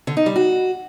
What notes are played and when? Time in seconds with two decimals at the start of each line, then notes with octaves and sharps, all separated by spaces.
0.07 D3
0.17 D#4
0.26 G3
0.36 F#4